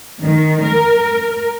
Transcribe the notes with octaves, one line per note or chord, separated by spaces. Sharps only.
D#3
A#4